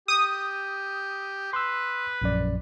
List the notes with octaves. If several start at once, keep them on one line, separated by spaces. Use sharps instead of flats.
G4 D#6
B4 C6 E6
A#1 F#2 D5